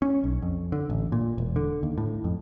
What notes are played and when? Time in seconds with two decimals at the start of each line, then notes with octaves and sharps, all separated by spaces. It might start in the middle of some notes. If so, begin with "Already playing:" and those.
0.02 C#4
0.24 B1
0.42 F2
0.72 D3
0.90 A1
1.12 A#2
1.38 E1
1.56 D3
1.83 D#2
1.98 A2
2.24 F2